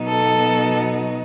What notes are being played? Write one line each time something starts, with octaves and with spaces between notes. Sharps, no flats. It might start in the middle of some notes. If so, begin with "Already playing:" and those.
Already playing: B2 F#3 B3 D#4
A4